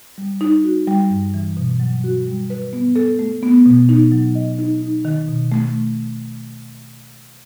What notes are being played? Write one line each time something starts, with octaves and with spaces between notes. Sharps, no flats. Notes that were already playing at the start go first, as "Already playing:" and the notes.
G3
D#4
F#4
G3
G2
E3
B2
F#3
F#4
G3
B4
B3
A4
A3
B3
B2
D#4
F#3
D#5
D#4
D#4
D#3
B2
A3